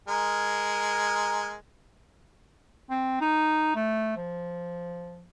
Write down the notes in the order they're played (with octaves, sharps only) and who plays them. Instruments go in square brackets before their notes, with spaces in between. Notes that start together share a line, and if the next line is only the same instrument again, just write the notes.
[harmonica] G#3 A#4
[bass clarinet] C4
D#4
A3
F3